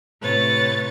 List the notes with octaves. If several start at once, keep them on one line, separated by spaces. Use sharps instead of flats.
A2 C3 B4 C#5 A6